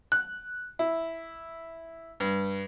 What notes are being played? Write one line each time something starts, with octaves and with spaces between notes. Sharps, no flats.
F#6
E4
G2